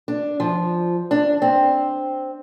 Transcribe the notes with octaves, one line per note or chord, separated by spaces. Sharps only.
D4
F3
D4
C4